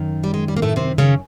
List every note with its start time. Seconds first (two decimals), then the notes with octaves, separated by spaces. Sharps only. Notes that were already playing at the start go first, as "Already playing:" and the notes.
Already playing: F#2 D#3
0.24 G3
0.34 G#3
0.48 G3
0.57 A#3
0.62 A2 A3
0.76 C3 C4
0.98 C#3 C#4